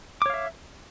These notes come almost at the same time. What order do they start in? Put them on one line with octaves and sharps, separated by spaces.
D6 C#5 F5 E5